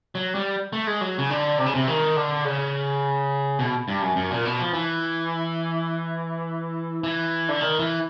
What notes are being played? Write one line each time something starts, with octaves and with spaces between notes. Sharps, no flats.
F#3
G3
A3
G#3
F#3
C#3
D3
C3
C#3
C3
D#3
D3
C#3
B2
G2
F#2
F#2
A#2
B2
F3
E3
E3
D3
D#3
E3